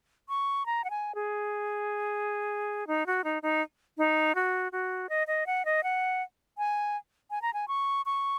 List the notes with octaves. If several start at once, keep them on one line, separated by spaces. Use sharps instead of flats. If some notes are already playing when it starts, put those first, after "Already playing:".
C#6
A#5
F#5
G#5
G#4
D#4
F#4
D#4
D#4
D#4
F#4
F#4
D#5
D#5
F#5
D#5
F#5
G#5
G#5
A#5
G#5
C#6
C#6